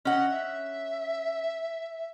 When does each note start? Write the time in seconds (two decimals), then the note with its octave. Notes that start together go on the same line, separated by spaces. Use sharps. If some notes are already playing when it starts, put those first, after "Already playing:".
0.05 C#4 D#5 F#5
0.31 E5